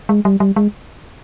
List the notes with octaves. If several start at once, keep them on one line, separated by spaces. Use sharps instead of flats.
G#3
G3
G3
G#3